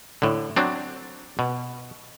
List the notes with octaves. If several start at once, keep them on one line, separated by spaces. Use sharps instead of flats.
A2 D3
F#3 C4 D4
B2